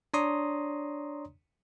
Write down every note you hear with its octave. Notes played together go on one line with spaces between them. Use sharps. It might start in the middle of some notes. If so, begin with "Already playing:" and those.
D4 C#5 D5 A#5 C6 D#6